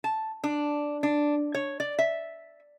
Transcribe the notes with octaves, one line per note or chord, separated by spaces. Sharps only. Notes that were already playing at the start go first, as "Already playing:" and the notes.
A5
D4
D4
C#5
D5
E5